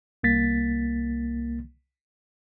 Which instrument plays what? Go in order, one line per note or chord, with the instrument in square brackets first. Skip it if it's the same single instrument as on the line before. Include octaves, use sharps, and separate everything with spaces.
[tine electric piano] C2 A#3 A6 B6